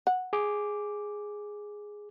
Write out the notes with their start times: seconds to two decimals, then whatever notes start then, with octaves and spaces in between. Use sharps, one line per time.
0.07 F#5
0.33 G#4 D6